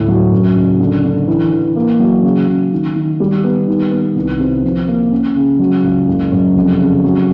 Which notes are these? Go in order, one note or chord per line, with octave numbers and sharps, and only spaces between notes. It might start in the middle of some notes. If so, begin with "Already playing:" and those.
Already playing: D2 A2
F#3
F#2
F#1
D3
D3
E3
E3
A#3
F#3
C#3
C#3
D#3
D#3
G3
B3
D#3
B3
C2
C3
F3
A#3
C#4
C#3
F#3
C#2
F#1
F#2
F1
C#3
F#3